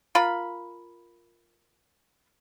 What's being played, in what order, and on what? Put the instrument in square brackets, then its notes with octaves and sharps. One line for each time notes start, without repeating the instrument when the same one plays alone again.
[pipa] F4 A#4 B5